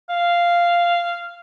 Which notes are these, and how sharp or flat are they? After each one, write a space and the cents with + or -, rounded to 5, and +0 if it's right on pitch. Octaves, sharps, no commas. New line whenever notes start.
F5 -10